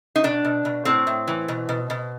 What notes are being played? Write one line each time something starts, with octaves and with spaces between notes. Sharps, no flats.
D#4
B2 D4
B2
B2
A2 C4
A2
E3
B2
B2
B2